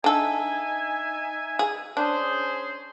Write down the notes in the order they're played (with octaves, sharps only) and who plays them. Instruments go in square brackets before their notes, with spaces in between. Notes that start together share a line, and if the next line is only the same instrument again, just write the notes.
[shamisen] D3 A4 [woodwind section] D#4 E5 G#5
[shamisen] G#4
[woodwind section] C#4 G#4 C5 [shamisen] D4